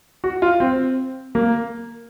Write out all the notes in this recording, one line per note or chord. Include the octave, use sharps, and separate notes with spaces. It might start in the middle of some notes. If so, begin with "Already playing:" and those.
F#4
F4
C4
A#3